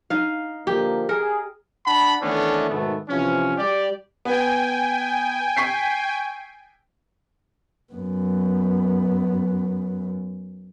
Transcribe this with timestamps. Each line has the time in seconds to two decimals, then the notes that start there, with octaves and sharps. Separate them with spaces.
0.10 D#4 F5
0.67 D3 F3 A#3 G4
1.09 G#4 A#4
1.86 D4 F#5 A5 B5
2.21 D#3 E3 A3 B3 C#4 D4
2.70 G#2 B2 D#3 A3 B3
3.08 C3 E3 F3 C#4
3.58 G3 G4 D5
4.25 B3 G5 G#5
5.57 C#6 B6 C7
7.93 F#2 B3